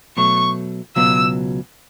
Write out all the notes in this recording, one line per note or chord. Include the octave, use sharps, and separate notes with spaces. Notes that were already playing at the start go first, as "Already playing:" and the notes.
B2 F#3 A3 C#6
C#2 B2 F#3 B3 E6